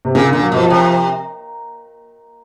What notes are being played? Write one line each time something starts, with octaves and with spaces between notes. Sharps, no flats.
C3
A#2 C#3
D3
A#2
F#3
B2 F3
C3